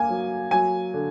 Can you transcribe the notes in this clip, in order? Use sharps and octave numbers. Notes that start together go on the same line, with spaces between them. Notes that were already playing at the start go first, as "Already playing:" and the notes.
Already playing: A#3 G#5
F#3
F#3 G#5
D3